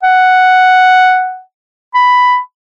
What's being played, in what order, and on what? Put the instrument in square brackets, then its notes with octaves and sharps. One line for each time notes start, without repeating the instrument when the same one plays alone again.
[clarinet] F#5
B5